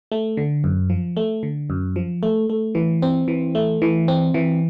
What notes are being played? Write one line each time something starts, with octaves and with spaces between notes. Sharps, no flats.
A3
D3
F#2
F3
A3
D3
F#2
F3
A3
A3
E3
C4
E3
A3
E3
C4
E3